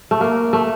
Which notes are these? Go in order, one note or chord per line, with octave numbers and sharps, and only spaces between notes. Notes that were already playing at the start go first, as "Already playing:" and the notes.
A3
A#3
A3